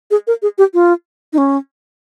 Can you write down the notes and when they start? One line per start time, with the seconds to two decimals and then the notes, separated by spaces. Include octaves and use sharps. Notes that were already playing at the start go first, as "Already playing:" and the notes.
0.11 G#4
0.27 A#4
0.42 G#4
0.58 G4
0.74 F4
1.33 D#4
1.38 C#4